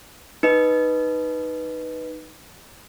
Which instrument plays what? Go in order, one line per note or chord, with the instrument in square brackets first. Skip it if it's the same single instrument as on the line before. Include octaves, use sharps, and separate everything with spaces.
[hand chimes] D#4 B4 D#5